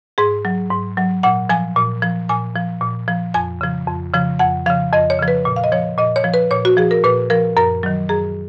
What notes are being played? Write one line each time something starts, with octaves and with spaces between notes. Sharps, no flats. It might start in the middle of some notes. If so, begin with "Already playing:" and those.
G#2 G#4
F#3
G#2
F#3
A#2 F#5
F3 G#5
A#2
F3
A#2 G#5
F3
A#2
F3
F2 G#5
C#3 F3
F2
C#3 F3
F2 F#5
C#3 F3 F5
F2 D#5
C#5
C#3 F3
B4
A#2
F5
D#5
F3 C#5
A#2 D#5
C#5
F3
B4
A#2 C#5
F#4
F3 G#4
A#4
A#2 B4
F3 A#4
F#2 A#4
D#3 F#3
F#2 G#4